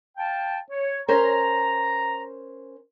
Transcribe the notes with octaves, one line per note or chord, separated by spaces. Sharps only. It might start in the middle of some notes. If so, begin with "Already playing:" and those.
F5 G5 A5
C#5
C#4 A#4 C5 A#5